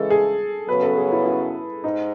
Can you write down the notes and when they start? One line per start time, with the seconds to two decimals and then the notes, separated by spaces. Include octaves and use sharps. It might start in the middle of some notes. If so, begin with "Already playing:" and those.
Already playing: C#3 E3 G#3 A4
0.10 G#4
0.68 F#2 C#3 F#3 B3 B4
0.82 A4
0.97 G#4
1.12 E4
1.25 E4
1.84 G#2 D#4